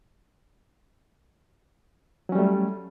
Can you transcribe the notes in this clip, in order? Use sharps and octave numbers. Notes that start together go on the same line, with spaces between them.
F#3 G3 A3 C#4